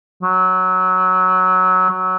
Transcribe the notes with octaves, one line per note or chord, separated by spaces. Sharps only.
F#3
F#3